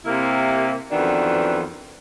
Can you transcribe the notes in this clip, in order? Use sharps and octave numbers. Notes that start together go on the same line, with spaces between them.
C3 A#3 E4
F2 D#3 E3 B3 D4 F#4